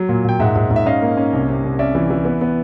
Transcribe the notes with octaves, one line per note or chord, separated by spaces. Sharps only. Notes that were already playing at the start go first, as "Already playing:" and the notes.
Already playing: F#3
A#2
A#2 G5
G#2 E5 F#5
G#2
G#2
E5
C#4 D#5 F5
A#3
C#4
C2
C3
C2
C#4 D5 E5
E3
E3
B3
B3